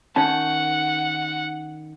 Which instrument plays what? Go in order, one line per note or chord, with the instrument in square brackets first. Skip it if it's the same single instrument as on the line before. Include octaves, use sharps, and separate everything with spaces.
[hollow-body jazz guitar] D#3 C#4 A5 [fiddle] F#5